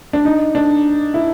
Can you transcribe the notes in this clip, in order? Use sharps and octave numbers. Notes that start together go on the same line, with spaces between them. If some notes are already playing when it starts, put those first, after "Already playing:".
D4
D#4
D4
E4